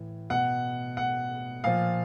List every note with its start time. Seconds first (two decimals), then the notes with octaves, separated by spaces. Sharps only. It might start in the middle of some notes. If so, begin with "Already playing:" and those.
Already playing: A2 E3
0.30 B2 F#5
0.97 F#5
1.64 A#2 F3 F5